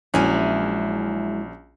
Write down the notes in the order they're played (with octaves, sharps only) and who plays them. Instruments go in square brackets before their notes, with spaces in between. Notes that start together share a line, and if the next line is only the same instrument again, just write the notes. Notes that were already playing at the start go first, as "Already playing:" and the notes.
[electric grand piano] A#1 C#4 G#5 [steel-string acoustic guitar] F#3 G#3 E4